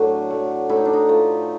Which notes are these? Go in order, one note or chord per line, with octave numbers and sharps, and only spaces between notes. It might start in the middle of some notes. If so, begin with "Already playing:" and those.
Already playing: A2 F#3 A3 D4
F#3 A3
A2 E4
D#4
D4
D#4
F3 A3